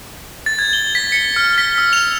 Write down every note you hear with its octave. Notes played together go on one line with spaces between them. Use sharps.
A6
G#6
G7
B6
C#7
F6
B6
E6
F7